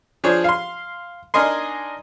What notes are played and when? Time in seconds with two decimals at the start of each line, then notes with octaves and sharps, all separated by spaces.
0.24 F3 D4 G#4 C5 C#5
0.44 F5 C6
1.34 D4 D#4 A#4 D#5 G#5 C6